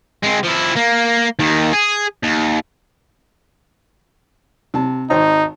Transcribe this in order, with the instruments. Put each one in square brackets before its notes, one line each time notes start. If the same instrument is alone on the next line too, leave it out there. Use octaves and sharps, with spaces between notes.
[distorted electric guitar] G#3 C4
F3 E4
A#3
D#2 D#3
G#4
D#2
[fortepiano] C3 A5
[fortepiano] G#1 C5 A#5 [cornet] D#4